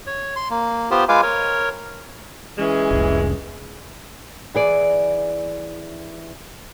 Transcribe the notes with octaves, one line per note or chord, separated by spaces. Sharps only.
C#5
C6
A#3
B3 F4 G4 C5
G#3 F4 B4 F5 G#5 D6
A#4 C#5
E3 G#3 C#4 G#4
F1 C2
E3 G#4 D5